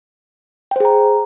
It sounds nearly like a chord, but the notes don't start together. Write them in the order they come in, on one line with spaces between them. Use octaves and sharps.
G5 C5 G#4 A#5